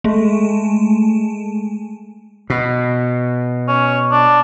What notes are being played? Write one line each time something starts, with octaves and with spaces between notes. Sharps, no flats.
G#3 A3
B2
C#4
D4